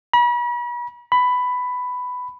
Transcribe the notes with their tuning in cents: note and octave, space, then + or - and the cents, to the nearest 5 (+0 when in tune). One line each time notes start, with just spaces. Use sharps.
B5 -40
B5 +10